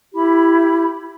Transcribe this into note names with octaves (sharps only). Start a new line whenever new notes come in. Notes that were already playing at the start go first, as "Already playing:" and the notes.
E4 G4 B5